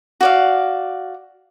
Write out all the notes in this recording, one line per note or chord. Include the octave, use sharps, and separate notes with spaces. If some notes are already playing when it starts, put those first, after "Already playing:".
F#4 D5 F5